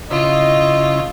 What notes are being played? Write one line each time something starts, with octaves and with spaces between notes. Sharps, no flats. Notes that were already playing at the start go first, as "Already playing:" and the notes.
C#3 E4 F4 D#5